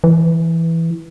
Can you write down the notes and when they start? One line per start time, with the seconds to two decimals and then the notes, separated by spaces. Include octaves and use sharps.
0.04 E3